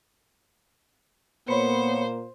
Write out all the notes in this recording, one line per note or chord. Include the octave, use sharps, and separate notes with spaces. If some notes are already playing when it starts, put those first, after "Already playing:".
A#2 A#3 B3 C5 C#5 B5 C#7